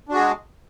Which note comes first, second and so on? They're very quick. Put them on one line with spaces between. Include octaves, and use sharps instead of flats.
D4 F#4 G#4 G#3